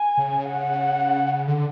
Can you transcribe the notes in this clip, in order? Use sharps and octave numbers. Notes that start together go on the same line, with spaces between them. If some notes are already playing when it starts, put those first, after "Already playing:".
Already playing: G#5
C#3
F#5
D3